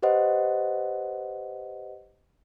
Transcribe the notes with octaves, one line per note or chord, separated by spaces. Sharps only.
G4 B4 C5 D#5 F#5